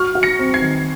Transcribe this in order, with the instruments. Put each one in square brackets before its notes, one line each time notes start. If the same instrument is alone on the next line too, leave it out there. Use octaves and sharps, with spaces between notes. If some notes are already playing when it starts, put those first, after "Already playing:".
Already playing: [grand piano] F#4 [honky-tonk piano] C#6 F6
[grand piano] F#4
[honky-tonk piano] A#6 C#7
[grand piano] C4
[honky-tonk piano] G#6 C7
[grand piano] D#3